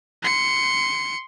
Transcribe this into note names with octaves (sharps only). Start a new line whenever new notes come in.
C6 C#7